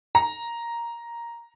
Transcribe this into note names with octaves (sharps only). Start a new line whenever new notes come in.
A#5